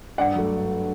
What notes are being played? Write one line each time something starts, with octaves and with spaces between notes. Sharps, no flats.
G2 D5 F#5
F#3 A3